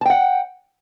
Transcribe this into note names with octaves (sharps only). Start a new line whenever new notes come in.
F#5 G5 A5